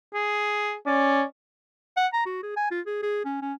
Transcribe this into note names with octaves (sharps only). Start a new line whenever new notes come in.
G#4
C#4 D5
F#5
A#5
F#4
G#4
G#5
F4
G#4
G#4
C#4
C#4